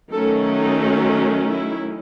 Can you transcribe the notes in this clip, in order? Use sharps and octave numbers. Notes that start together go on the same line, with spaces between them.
D#3 F#3 A3 C#4 A4
D#4
E4